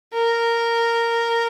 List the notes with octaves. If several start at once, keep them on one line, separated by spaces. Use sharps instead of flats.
A#4